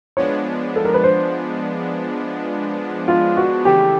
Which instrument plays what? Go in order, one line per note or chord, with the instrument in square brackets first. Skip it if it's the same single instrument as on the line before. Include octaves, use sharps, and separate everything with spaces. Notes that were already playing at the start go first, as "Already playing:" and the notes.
[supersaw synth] F3 G#3 B3 D4 [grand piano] C#5
[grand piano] A4
A#4
B4
C5
F4
F#4
[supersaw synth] C#3 E3 A3 [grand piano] G4